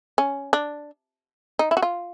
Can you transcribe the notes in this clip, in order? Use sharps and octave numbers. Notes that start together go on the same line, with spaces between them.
C#4
D4
D#4
E4
F#4
F4